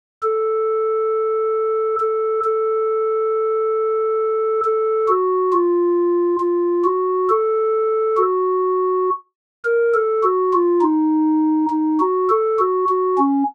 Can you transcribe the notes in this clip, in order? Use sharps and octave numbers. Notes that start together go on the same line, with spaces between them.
A4
A4
A4
A4
F#4
F4
F4
F#4
A4
F#4
A#4
A4
F#4
F4
D#4
D#4
F#4
A4
F#4
F#4
C#4